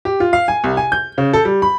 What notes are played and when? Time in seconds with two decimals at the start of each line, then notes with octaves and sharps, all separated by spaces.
0.05 G4
0.20 F4
0.33 F5
0.48 G#5
0.64 C2
0.77 G#5
0.92 G6
1.18 C#3
1.33 A4
1.45 G3
1.62 B5